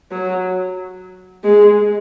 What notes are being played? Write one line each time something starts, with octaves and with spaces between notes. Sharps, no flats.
F#3
G#3